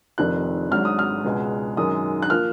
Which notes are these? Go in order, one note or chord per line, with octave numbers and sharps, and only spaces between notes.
F1 F2 D#3 F#6
G#1 G#2 F#3 F6
D#6
F6
C#2 B2 G#3
F#2 D#3 G#3 D#6
F#6
F3 A#3 F6